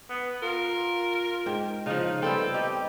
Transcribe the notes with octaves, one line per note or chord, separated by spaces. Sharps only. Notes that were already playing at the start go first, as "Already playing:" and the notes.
B3
F4 A#4
G#2 G5
C#3 F3 D#4 F5
G3 B3 C4 A4 G5
D#4 G4